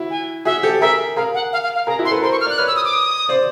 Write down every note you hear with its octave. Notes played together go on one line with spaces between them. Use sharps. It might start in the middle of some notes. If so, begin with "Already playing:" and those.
Already playing: E4 F#4
G#5
F#4 G#4 E5
G4 A4
G#4 A#4 E5
G#4 A#4 F5
F#5
F5
F5
F5
G#4 A#4 A#5
E4 F#4
C6
A4 B4
A#4 C5 C6
C#6
F6
D5 F#6
B4 C#5 F6
E6
D#6
D6
D#6
C5 D5